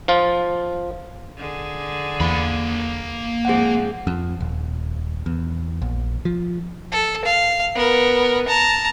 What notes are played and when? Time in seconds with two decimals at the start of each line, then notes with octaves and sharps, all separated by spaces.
0.08 F3 F4
1.38 D3 G#4
2.20 E2 A#3 B5
3.45 G#2 F3 C4 G#4 F#5
4.07 F2
4.41 D#1
5.26 E2
5.82 A#1
6.25 F3
6.92 A4
7.25 F5
7.75 B3 A#4
8.48 A5 A#5